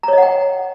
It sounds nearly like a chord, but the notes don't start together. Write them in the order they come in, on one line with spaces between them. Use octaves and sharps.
A#5 C#5 D#5 F#5 G5